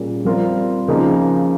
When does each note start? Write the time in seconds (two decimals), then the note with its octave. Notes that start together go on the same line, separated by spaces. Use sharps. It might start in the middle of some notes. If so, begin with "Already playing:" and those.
Already playing: A#2 G3 A#3 C#4 G#4
0.25 G3 C4 F4 A#4
0.88 C#3 F3 A#3 D#4 G#4